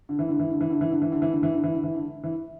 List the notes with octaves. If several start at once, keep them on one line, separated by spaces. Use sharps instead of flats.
D3
E3
D3
E3
D3
E3
D3
E3
D3
E3
D3
E3
D3
E3
D3
E3
D3
E3
D3
E3